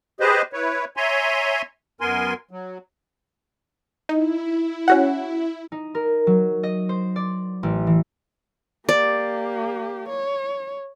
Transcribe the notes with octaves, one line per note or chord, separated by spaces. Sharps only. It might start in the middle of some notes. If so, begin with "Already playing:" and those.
G4 G#4 B4 C5 D#5
E4 B4 C#5
C#5 E5 G#5 A#5 C6
F#2 B3 A#4 G#5 C6
F#3
D#4 E4
C#4 F#4 F#5
D#4
A#4
F#3
D#5
C5
D5
A1
E3
A#3 G4 D5
C#5